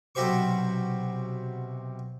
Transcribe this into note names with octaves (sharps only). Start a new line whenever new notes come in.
B1 C3 F#4 G4 C5 C#6